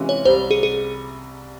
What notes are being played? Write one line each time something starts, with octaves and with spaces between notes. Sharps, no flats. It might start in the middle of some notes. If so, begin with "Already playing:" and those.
Already playing: C3 E3 G#3 C#4 F4
C#5
C2 C3 G3 C5
G#4
G#4